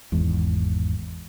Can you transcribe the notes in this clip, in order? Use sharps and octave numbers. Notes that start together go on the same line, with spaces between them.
G#1 E2 G#2